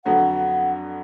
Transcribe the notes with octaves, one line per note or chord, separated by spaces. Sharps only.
F2 D3 F#3 B3 F#5